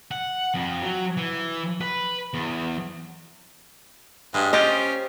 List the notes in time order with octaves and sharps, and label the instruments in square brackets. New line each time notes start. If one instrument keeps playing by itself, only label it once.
[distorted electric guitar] F#5
F2
F#3
E3
B4
E2
[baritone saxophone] G2 [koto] G#3
[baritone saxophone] C#4 [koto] F4 G4 C5 [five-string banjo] D#5